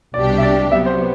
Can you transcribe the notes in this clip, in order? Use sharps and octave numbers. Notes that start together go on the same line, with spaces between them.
C2 B2 G3 D4 G4 D5
E5
D5
C3 F#3 B3 E5
C5